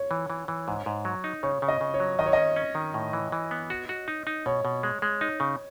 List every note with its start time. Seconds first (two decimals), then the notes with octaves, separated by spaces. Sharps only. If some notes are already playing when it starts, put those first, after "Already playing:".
Already playing: C#5
0.11 E3
0.30 E3
0.48 E3
0.68 G#2
0.86 G#2
1.05 F#3
1.24 D#4
1.43 C#3 C#5
1.62 C#3
1.68 D#5
1.81 C#3
1.94 C#5
2.00 F#3
2.19 D#3 D#5
2.26 C#5
2.33 C#4 D#5
2.56 C#4
2.75 D#3
2.94 A2
3.13 E3
3.32 E3
3.51 B3
3.70 F#4
3.89 F#4
4.08 D#4
4.27 D#4
4.46 B2 C#5
4.65 B2
4.83 G#3
5.02 G#3
5.21 D#4
5.40 C#3